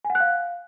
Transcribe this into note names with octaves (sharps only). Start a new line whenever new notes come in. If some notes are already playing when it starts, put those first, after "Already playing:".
G#5
F#5
F#6
F5